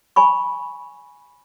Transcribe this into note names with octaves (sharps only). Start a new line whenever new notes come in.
G#5 B5 C#6